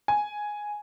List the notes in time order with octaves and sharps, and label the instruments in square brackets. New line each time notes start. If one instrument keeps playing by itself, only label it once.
[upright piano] G#5